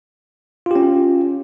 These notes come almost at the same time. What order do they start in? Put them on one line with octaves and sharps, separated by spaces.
F4 G4 C#4